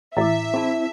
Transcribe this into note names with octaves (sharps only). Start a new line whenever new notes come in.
A1 E4 E5 D6
C4 E4 G#4 A5